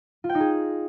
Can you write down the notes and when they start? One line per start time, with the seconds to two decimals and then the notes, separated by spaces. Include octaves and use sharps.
0.24 F4
0.29 G5
0.35 D#4
0.40 G#4